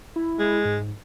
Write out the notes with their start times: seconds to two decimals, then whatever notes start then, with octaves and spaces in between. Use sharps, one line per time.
0.16 E4
0.39 G#3
0.65 G#2